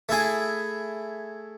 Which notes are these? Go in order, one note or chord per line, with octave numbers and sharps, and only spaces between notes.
A3 E4 G#4